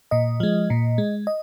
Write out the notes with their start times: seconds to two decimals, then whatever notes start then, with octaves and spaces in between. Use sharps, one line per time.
0.11 A#2 D#5
0.40 F3 G#3
0.70 A#2
0.98 G#3
1.27 D#5